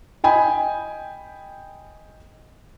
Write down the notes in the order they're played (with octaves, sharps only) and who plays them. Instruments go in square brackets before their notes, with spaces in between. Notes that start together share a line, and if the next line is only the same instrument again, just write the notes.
[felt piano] D#5 G5 G#5 B5